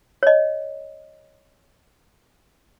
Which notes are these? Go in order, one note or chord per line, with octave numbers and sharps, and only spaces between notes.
C#5 D#5